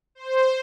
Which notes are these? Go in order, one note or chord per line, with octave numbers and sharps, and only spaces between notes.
C5